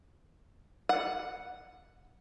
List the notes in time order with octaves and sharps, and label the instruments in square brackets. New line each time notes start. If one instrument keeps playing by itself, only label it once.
[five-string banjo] F#5